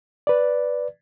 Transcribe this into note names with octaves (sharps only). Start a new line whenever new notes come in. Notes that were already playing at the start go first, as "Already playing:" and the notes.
B4 D5